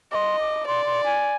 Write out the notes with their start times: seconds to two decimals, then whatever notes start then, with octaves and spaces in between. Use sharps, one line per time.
0.11 D#5 D6
0.15 C6
0.40 D6
0.67 D5 C6
0.85 C6
1.04 G#5